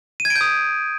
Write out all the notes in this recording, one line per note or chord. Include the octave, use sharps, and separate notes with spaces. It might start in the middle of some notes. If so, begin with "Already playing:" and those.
D#7
G#6
D7
G6
D#6